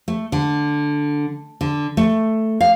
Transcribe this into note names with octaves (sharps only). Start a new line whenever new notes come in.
A3
D3
D3
A3
F5